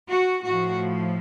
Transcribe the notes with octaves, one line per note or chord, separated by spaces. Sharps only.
F#4
A2 F3 F#4